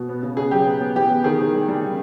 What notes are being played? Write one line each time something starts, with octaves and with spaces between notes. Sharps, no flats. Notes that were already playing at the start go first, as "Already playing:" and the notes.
Already playing: B2
B3
C#3
C#3 G#4
F#3 G4
B3
B3
E3 G4
B3
D#3 G#4
D#3
G3
G3
C#3